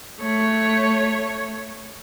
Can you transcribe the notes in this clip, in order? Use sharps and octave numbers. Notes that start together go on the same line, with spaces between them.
A3 C#5